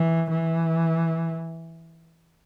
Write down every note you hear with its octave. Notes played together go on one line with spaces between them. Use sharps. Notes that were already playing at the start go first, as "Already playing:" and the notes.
Already playing: E3
E3